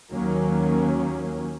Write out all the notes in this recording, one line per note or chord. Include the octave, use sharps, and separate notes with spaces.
D#2 D#3 F#3 A#3 C#4